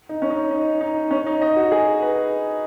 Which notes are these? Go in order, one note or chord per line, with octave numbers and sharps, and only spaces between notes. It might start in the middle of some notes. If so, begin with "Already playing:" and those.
D#4
C#4
D#4
D#4
D#4
C#4
D#4
D#5
F#4
G#4
B4